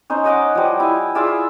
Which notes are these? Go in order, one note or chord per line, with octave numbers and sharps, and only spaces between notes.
C#4 D#4 C5
C#5 D#5 F#5 D6
F3 G3
E4 G#5
F4 G#4 D5 E5